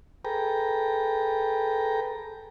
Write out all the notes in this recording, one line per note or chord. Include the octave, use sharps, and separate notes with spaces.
G#4 A4 B4 G5 A#5